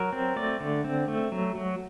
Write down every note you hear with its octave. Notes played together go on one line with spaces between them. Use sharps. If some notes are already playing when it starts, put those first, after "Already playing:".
Already playing: F#3 A#4
C4
A3 D5
D3
C4
A3
F#3
F#3